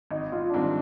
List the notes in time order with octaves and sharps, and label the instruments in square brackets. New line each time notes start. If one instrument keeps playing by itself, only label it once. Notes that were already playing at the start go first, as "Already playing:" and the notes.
[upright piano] G#1 [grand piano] D#4
[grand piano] F4
D4
[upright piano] G#2 D#3 G3 C4 [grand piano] D#4